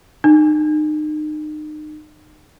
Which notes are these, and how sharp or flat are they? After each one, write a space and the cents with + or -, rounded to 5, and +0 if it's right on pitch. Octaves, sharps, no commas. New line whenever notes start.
D#4 -35